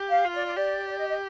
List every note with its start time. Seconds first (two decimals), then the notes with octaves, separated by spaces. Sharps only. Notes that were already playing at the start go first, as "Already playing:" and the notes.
Already playing: G4
0.10 F5
0.25 F4
0.35 D5
0.46 D5
0.56 G4 D5
0.88 D5
0.98 D#5
1.09 D#5